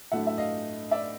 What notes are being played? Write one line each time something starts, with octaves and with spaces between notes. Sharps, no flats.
A2 F#3 A3 D4 E5 F#5
E5
D#5 F5
D5 E5